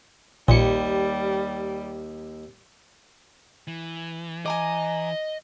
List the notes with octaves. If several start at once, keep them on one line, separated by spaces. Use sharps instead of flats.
A#1 D#2 G3 C#7
E3
D#5 G#5 A#5 D6